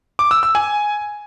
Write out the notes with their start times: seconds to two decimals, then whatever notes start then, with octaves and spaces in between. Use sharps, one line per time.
0.19 D6
0.31 E6
0.43 E6
0.55 G#5